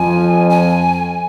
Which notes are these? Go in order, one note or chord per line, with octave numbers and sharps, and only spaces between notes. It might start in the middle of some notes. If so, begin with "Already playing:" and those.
Already playing: F2 F3 G#5
G#5